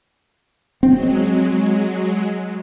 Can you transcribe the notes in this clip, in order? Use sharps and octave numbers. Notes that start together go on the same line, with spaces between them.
F#3 G#3 C4